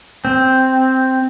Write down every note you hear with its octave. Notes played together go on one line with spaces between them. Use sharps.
C4